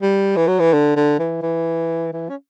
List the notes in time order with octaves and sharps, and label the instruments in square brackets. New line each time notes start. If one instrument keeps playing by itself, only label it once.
[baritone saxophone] G3
E3
F#3
E3
D3
D3
E3
E3
E3
C#4